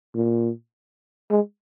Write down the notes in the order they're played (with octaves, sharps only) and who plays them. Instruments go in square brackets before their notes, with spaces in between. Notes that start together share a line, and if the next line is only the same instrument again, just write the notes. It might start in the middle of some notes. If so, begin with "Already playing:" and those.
[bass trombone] A#2
G#3